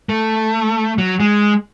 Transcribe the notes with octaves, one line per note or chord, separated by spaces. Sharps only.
A3
F#3
G#3